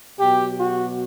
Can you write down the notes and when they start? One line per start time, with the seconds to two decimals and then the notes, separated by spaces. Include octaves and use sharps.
0.18 B2 F#3 G4
0.58 F#4